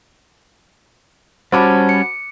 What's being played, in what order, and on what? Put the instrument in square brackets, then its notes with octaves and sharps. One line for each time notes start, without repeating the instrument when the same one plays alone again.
[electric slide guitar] G3 C#4 [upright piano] F#4 B5 D6 [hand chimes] C5 A5
[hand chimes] C#7